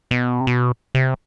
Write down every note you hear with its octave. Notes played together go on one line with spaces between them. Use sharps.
B2
C3
B2
C3